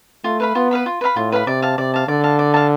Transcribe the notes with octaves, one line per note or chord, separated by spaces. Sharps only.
A3 F4
B4 F5 B5
B3 F4
B4 F5 B5
F4
B4 F5 B5
A2 F4
B4 F5 B5
C3 D5
F5 A5
C3 D5
F5 A5
D3 D5
F5 A5
D5
F5 A5